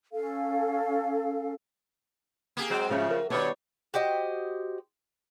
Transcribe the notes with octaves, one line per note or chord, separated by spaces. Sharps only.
C#4 A4 F5
A#3 G4 G#4
F#3 G#3 C4
G#2 C#3 F3 C#4 E5
A#4
B2 D#3 G3 B3 D4 C#5
F#4 G4 C5 D#5